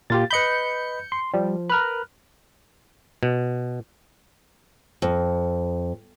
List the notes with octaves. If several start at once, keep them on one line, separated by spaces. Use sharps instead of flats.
A#2 F4 G4 A6
B4 D#5 B5 G6 C#7
C6
F3 G3
A#4 B4 F6 F#6
B2
F2